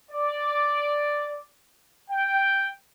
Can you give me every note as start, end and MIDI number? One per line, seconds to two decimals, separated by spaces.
0.11 1.45 74
2.11 2.68 79